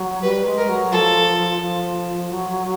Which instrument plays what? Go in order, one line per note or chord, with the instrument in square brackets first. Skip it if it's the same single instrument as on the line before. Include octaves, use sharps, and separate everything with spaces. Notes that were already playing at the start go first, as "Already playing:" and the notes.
Already playing: [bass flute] F#3
[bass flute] G3 [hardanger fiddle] B4
[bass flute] G#3
[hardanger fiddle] A#4
[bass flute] F#3
[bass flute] F3 [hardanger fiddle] A4
[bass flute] F3
F#3